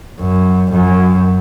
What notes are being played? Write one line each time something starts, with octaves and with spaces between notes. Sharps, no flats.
F#2
F#2